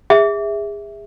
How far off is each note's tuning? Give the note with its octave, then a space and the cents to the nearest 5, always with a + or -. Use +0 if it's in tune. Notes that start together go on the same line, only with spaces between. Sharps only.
G#4 -30 E5 -10